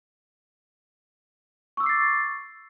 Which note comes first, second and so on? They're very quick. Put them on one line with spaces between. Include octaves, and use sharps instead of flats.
C#6 E6 D6 C7 A6